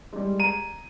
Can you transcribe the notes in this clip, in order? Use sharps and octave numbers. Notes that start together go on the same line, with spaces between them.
G3 G#3
A#5 D#7